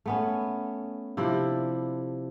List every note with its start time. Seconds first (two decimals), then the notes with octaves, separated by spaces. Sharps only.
0.06 A3 B3 C#4
1.17 C3 F3 D4 E4